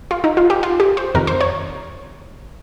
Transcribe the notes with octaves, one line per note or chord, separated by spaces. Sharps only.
F4
D#4
F4
G4
F4
G4
C5
F2 C3 D#3 A#4
C5
C#5